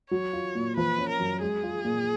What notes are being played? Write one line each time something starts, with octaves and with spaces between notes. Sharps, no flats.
F#3 C#5
F4
A#2
F3 B4
C#4
A#4
F#2
G#3 G#4
F4
A#2